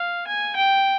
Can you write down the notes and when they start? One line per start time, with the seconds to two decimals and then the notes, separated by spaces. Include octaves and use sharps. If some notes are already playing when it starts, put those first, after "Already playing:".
Already playing: F5
0.28 G#5
0.56 G5